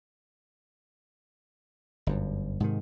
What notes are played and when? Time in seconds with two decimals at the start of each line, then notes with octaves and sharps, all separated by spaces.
2.07 G1 F#2
2.60 G#2 C3 D#3